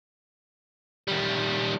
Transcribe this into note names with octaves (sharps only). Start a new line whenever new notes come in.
D#3 G3